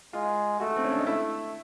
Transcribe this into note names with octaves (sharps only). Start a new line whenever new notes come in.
G#3 F4
A3 F#4
C4
C#4
D4
D#4
A3 E4